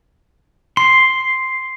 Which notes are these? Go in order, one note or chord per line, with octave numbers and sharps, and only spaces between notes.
C6 C7